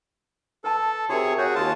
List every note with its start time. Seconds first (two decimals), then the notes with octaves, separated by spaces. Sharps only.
0.64 A4 B4 A5
1.09 C3 F#4 G#4 A#4 C#5
1.38 F#4 G#4 C#5
1.55 D#2 F4 F#4 A5